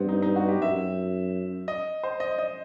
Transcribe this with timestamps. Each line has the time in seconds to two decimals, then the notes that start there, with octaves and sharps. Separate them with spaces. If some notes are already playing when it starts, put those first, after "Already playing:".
Already playing: G2 B3 C4
0.09 D#4
0.22 D#4
0.36 F#4
0.48 G4
0.61 F#2 E5
1.68 D#5
2.03 C5
2.20 D#5
2.39 D#5